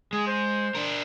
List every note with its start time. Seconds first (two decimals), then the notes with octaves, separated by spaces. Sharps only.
0.13 G#3 G#4
0.27 C5
0.75 D4 A#4